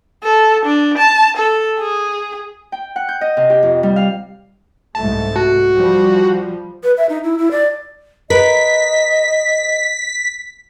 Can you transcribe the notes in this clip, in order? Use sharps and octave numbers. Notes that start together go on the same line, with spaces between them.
A4
D4
A5
A4
G#4
G5
F#5
G6
D#5
C3
G4
F2
G3
F5
C2 G#2 A3 A5
F#4
F3 G3
B4
E5
D#4
E4
E4
D5
A#4 B4 D#5 B6